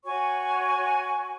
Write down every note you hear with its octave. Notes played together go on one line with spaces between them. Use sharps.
F#4 C#5 G#5 C#6